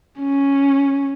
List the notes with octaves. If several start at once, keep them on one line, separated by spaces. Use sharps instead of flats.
C#4